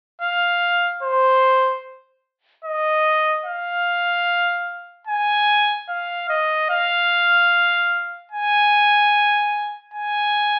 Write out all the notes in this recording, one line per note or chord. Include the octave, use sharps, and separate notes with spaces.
F5
C5
D#5
F5
G#5
F5
D#5
F5
G#5
G#5